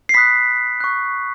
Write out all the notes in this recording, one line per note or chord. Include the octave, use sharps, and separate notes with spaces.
C7
B5 D#6 F#6 B6
C#6 F#6